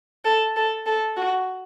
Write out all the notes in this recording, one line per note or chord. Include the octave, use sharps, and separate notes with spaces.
A4
A4
A4
F#4